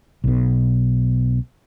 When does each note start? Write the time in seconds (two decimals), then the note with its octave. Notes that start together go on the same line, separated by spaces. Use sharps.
0.24 B1 B2